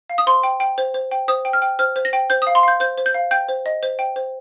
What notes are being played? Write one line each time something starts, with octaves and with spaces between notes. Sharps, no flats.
F5
D#6
C5 C6
G5
G5
C5
C5
G5
C5 D#6
G5
F6
G5
C5 F6
C5
A#6
G5
C5 G6
F5 D#6
C6
F5 G6
C5 G6
C5
G6
F5
G5 G6
C5
D#5
C5
G5
C5